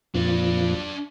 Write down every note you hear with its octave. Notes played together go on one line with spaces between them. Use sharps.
F2 A#2 F3 D4 B4